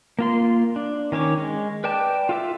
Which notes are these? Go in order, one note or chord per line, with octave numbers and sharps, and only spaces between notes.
A#3 F4 C6
D4
D#3 C#4 C#5 D6
G#3
B4 D5 G5 A5
F4 A4 E5